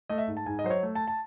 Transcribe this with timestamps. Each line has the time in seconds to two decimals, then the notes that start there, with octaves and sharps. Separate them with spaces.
0.09 A3 D#5
0.18 E5
0.27 G#2
0.37 A5
0.46 G#2 G#5
0.59 D#5
0.64 F#3 C5
0.70 C#5
0.83 A3
0.95 A5
1.07 A5